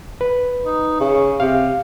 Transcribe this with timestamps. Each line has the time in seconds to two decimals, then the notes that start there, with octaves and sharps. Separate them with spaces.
0.21 B4
0.65 D#4
1.00 C#3
1.40 C3 F5